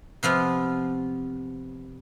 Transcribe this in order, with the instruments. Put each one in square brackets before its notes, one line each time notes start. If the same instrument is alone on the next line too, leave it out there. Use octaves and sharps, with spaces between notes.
[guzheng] C3 F3 B3 F4